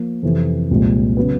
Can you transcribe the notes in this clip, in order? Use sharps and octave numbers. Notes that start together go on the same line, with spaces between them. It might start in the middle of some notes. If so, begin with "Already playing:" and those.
Already playing: F3 A#3
F2 C3 E3
C2 A#2 F3 G#3
C#3 F#3 B3